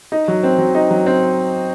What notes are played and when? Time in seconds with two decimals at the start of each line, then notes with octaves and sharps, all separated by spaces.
0.12 D#4
0.28 F#3
0.43 C4
0.58 F#3
0.75 D#4
0.91 F#3
1.06 C4